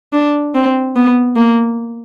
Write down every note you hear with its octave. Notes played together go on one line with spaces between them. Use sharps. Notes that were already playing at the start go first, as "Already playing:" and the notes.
D4
C4
B3
A#3